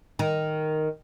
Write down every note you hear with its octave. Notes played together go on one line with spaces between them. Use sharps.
D#3